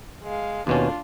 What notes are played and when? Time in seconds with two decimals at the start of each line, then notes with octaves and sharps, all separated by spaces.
0.24 G#3 F5
0.67 D#2 B2 C#4 D4 F4